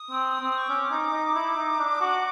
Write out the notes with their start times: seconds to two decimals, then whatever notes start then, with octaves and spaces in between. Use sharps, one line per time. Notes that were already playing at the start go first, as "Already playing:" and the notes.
Already playing: D#6
0.11 C4
0.40 C4
0.58 C#6
0.69 C#4 D6
0.91 D#4
1.13 D#4
1.35 E4
1.57 D#4
1.79 D4
2.01 F#4